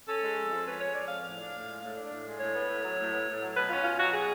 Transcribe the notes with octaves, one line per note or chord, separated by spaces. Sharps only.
C#4 A4
G#3
F2
F3
C#4 B4
G#3 C#5
F2 D5
F3 F5
A2 F5
D4
A2
G#3
A2
D4
A2
G#3
A2 C#5
B3
A2
F#3
A2
B3
A2
F#3
B2 B4
C#4 F4
B2 F4
F#3 F#4
B2 G#4